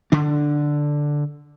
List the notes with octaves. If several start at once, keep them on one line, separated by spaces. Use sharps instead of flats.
D3 D4